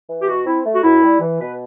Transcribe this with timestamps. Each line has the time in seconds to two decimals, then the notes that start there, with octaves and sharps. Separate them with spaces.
0.10 E3
0.22 G4
0.27 B2 F#4
0.46 C4 E4
0.65 A3
0.74 F#4
0.83 F#2 E4
1.02 G3
1.21 E3
1.40 B2 B4